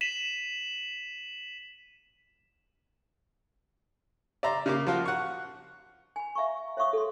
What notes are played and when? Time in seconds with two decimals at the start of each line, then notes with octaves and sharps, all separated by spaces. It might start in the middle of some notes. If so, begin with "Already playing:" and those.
0.01 B6 D#7 E7 F#7
4.43 D5 E5 A#5 C6
4.66 C#3 A#3 D6
4.87 F3 F4 F#4
5.05 F#5 C#6
6.16 G#5 B5
6.35 E5 F5 A#5 C#6
6.77 C#5 E5 F5 C#6 D#6
6.93 A4 C6